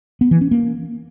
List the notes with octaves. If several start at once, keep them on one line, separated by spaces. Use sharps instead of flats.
B3
E3
C#4
A#3